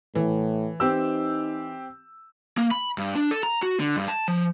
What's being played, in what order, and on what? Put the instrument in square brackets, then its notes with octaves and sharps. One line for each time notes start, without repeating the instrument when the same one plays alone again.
[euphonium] A2 [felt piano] E3
[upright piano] C4 G4 E6 [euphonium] D#4
[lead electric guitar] A#3
B5
G2
D4
A4
A#5
F#4
D3
G2
A5
F3